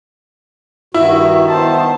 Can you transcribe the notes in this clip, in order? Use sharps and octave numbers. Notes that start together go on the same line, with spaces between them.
G2 D#3 E4 F#4
B3 C5 A5